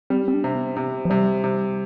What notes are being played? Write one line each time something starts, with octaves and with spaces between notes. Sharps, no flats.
G3 C4
C4
D4
C3
B3
C3
F3
C3 G3
C3